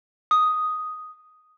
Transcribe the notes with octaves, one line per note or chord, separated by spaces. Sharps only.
D#6